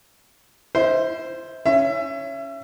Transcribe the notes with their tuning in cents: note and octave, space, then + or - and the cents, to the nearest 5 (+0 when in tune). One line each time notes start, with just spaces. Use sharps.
E4 +35 C5 +0 E5 -40
C#4 +0 E5 +30